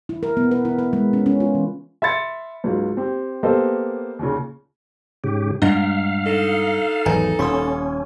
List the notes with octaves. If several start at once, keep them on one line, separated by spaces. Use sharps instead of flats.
E4
A#4
B3
B4
E4
B4
G#3
C#4
C#4
F4
E3
E5 B5 C6 A6 C#7
C#2 G#2 F#3 F4
C4 G4
A#3 B3 G4 A4 C5 D#5
D#2 A#2 C#3
G#2 C#3 G4
G2 A#2 G#3 D4 D#5 F5 F#5
D#4 A4
G#1 E2 F#3 B4 G#5 A#5
D#1 C#4 B5 C6 D#6